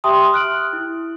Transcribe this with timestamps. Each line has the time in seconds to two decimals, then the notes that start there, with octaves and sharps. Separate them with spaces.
0.04 G4 E5 G5 A5 C6 D#6
0.33 F6 F#6 D7 F#7
0.73 E4